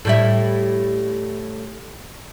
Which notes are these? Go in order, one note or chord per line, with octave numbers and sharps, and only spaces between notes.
A2 G3 E4